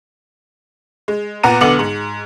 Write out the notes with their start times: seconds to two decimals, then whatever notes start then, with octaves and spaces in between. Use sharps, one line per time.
1.08 G#3
1.43 A#2 B3 F#5 A#5 D#7
1.61 B1 D3 B3 D6 C#7 F#7
1.79 G#2